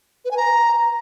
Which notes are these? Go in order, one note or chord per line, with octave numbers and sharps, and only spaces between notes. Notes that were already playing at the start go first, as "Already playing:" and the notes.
B4
G#5
A#5